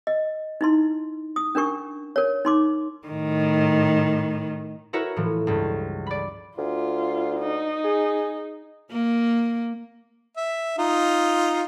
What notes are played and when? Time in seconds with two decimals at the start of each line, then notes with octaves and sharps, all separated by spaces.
0.07 D#5
0.61 D#4 E4 C6
1.36 D#6
1.55 C#4 D4 A#4 C#6
2.16 A#4 C#5
2.45 D#4 C6 D6
3.08 A2 D#3
4.93 E4 F#4 A#4 B4 C#5 E5
5.16 A2 E3 F3
5.47 C#2 G2
6.07 D5 B5
6.58 D2 F4
7.40 D#4
7.84 G#4
8.91 A#3
10.37 E5
10.78 D#4 F4